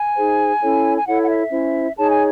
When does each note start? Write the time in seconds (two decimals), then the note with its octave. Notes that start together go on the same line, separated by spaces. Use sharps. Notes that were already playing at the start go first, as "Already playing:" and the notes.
Already playing: G#5
0.15 D#4 G#4 C5
0.61 C#4 E4 A4 C#5
0.95 G#5
1.06 E4 A4 C#5 F#5
1.22 F#5
1.29 E5
1.51 C#4 E4 C5
1.96 D#4 G#4 C#5 A5
2.10 G#5